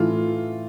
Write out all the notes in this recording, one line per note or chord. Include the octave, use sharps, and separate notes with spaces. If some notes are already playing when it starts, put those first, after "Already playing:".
Already playing: A2 E3 A3 F4